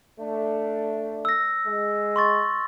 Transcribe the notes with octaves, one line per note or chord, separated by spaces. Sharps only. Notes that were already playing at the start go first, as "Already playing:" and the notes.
A3 D4
E6 A#6
G#3
C6 C#6 A6